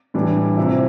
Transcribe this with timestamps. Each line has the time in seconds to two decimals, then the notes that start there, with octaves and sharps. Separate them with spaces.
0.14 A2 E3 G3 D4
0.57 C3 F3 E4